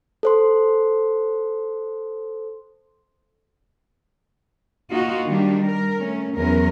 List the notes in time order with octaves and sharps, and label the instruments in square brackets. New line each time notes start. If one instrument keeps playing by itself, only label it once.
[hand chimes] A4 C5 C6
[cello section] A#3 D#4 F4 F#4
D#3 G3 D4
A#4
A3 C#4
E2 F#3 C#4 A#4